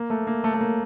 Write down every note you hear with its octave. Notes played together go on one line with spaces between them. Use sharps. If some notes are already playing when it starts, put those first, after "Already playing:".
Already playing: A#3
A3
A#3
A3
A3
A#3